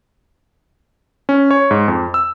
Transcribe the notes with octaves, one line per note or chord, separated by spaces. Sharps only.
C#4
C#5
G#2
F2
E6